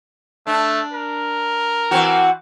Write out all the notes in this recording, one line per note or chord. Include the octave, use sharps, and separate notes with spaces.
A3 D4
A#4
E3 C4 F#4